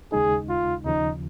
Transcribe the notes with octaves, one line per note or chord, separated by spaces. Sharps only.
D#2 C#3 G#3 D#4 G#4
F4
D#2 C#3 F3 D#4